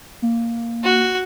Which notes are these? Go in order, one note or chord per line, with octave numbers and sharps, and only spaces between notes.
A#3
F#4